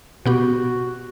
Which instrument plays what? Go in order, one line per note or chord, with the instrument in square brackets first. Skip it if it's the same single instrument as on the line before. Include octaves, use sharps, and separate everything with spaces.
[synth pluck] B2 B3 G4 [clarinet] F#4